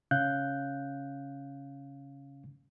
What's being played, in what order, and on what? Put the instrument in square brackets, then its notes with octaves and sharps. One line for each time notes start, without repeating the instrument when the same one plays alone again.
[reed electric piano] C#3 C#4 F5 F#6 G6